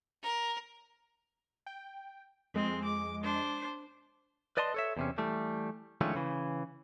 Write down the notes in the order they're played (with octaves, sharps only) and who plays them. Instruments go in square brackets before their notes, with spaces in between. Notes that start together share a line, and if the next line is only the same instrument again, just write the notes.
[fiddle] A#4
[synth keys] G5
[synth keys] F2 G#3 D#5 [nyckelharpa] C4
[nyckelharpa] D6
D4 C5
[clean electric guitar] B4 D5 D#5 A5 C6
A4 C#5 E5
E2 C3 C#4
E3 G3 A3
D3 D#3 F3 G#3 A3 C#4
C#3 E3